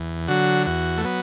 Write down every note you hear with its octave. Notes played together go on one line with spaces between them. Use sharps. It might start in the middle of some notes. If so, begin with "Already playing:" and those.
Already playing: E2
D3 F#3 F#4
E2 F#4
A3
F#3 B3